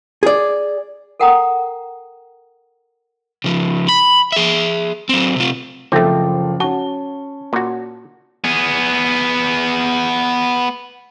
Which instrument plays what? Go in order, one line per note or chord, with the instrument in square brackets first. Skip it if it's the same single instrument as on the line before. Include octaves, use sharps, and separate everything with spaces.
[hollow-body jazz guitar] G#4 D5
[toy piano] A4 A#4 F#5 G5 A#5 D#6
[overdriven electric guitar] C#3 F3
B5
G#4 E5
F#3 C4
C3 F4
[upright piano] F#1 F3 [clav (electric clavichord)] A3 C4 [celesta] A4 G5 D6
[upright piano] C#4 G7 [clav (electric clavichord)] F#4 [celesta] A5
[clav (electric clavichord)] A#2 F#4
[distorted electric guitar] B3 G#4